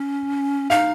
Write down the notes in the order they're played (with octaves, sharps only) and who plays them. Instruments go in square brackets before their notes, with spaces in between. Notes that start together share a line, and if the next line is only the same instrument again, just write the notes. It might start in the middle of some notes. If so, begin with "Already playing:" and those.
Already playing: [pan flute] C#4
[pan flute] D#4 [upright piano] F5